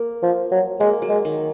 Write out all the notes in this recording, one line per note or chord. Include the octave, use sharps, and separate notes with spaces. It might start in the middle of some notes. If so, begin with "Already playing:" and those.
Already playing: A#3
F3
F#3
G#3 A#3
F#3
G#3
D#3